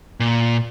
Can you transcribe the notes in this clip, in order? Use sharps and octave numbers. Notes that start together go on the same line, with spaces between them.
A#2